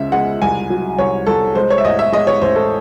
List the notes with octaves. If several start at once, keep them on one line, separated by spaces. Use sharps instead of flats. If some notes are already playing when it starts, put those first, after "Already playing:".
Already playing: C#2 C#3 E5
G#3 F#5
C2 G#5
F#3
C2 C#5
C2 A4
G#3 C5
C#5
E5
A1 D#5
E5
G#3 D#5
C#5
A1 C5
A4